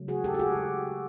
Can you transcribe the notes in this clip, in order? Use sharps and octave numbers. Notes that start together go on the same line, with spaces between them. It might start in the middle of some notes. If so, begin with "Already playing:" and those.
Already playing: C#3 F#3 A3
F#4 G#4
G4 A4
G4
F#4 G#4